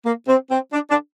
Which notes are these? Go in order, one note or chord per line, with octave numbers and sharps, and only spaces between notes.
A#3
C4
C4
D4
D4